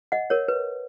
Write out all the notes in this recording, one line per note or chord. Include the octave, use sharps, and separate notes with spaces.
D#5 F#5
A#4 C#5
B4